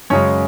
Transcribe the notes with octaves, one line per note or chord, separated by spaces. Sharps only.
F#2 C#3 G#3 C#4 C#5